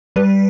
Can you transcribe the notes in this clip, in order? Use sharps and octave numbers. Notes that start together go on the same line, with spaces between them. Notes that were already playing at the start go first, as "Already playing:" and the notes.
G3 B4